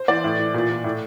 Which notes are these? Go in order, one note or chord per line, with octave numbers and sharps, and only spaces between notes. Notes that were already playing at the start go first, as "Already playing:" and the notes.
Already playing: C5
E3 D5
A2
E3
A#2
A#2
A2